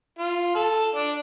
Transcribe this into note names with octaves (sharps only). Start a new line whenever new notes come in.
F4
A4
D4